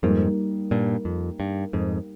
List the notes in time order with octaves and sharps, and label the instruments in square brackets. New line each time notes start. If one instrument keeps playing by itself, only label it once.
[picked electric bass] F2 G#2 [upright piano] G3 A#3 D#4
[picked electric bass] G2 A#2
F2
G2
F2 G#2